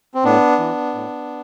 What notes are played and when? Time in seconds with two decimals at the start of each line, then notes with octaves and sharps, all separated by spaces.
0.14 C4
0.24 A2 B3 D4
0.59 E3
0.94 A2